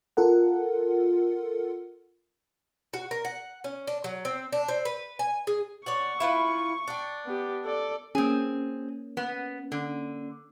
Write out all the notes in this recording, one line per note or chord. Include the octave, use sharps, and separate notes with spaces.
F4 A4 A#4 F#5
F#4
A#4
F#5
C#4
D4
F#3
C4
D4
C4
B4
G#5
G#4
C#5 D5 F#5 C#6
E4 F4 B4
D4 G5
B3 G4
A4 D5
A#3 C4 C#4 G#4
B3
D3